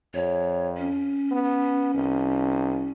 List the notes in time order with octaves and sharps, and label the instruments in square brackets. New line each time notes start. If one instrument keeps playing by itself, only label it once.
[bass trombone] F2 [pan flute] C#5
[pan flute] C#4
[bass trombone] B3
C2